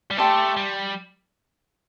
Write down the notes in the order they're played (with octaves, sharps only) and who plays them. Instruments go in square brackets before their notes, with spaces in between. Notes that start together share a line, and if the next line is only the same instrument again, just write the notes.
[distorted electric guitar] G3
[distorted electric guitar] A3 [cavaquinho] G4 D5 A5 C6
[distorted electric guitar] G3